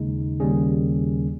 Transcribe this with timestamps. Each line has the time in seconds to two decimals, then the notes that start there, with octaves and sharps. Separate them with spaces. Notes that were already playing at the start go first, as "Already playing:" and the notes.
Already playing: D#2 C#3 G#3 D#4
0.40 D#2 C#3 G3 C#4 G#4